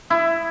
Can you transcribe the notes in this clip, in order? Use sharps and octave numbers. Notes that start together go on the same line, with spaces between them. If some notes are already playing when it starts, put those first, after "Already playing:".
E4